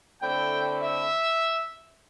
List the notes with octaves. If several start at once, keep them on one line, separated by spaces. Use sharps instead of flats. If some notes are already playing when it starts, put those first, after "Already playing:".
D3 A3 C4 E4 G5
E5